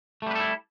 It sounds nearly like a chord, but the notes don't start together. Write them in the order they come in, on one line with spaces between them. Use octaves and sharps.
A3 G3 B4 A4 E4